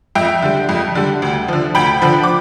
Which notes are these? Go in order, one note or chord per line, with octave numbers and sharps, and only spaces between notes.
F2 E5 G5
D3 G3
F2
D3 G3
D2
D3 F3
D2 G5 B5
D3 F3
D6